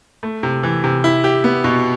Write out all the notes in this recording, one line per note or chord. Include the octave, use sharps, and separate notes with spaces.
A3
C3
E3
C3
E4
G4
B3
B2